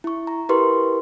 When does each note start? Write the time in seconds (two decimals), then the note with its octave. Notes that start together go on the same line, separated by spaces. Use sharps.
0.04 E4 C#6
0.27 A#5
0.49 E4 G4 A#4 B4 C6 C#6